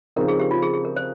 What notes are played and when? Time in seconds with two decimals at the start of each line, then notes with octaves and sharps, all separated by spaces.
0.16 C#3 F3 C4 D#4 A#4
0.28 G#4
0.39 G4
0.51 F4
0.62 G#4
0.73 G#4
0.85 A#4
0.96 C5